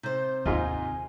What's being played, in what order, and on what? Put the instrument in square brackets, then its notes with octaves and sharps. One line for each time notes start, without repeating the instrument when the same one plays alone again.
[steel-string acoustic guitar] C3 C5 [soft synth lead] G6
[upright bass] D#2 C4 [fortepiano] G#2 D#4 F4 [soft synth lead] G#5